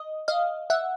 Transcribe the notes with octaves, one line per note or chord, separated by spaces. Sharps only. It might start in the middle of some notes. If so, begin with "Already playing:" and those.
Already playing: D#5
D#5 F5
E5 F#5